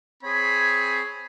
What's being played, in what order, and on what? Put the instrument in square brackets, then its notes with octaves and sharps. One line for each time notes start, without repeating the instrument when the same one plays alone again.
[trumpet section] C4 G#4 C#5 B5